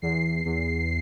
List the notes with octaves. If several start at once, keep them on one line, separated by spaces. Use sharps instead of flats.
E2 C7
E2